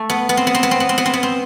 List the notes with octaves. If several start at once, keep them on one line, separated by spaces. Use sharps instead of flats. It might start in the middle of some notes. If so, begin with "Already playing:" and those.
Already playing: A3
B3
B3
C4
B3
C4
B3
C4
B3
C4
B3
C4
B3
C4